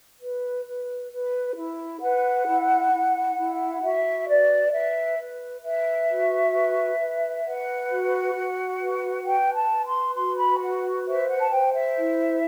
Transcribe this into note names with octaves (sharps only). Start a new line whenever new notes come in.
B4
B4
B4
E4
B4 F#5
E4
E4
E4
F#4 E5
B4 D5
B4 E5
B4
B4 E5
F#4
B4
B4
B4 F#5
F#4
F#4
B4
B4 G5
A5
B4
C6
F#4 C6
B5
B4 F#5
C5 E5
F#5
A5
C5 G5
E5
E4